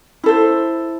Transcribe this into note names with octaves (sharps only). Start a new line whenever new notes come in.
E4 A4 C5